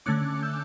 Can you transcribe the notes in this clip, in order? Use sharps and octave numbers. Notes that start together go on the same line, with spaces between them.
D3 A3 C#4 D6 F#6
E6 G6